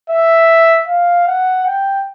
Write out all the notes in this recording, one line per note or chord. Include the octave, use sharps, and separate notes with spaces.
E5
F5
F#5
G5